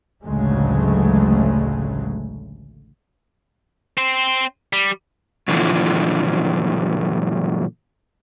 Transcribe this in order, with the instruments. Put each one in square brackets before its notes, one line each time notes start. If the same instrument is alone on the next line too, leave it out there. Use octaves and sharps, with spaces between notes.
[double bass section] A1 D2 C#3 F#3 G#3 A3
[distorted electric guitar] C4 C5
G3
[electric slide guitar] F#2 A#2 D3 E3 F3